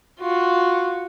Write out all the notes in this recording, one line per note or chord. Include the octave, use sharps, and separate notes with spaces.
F4 F#4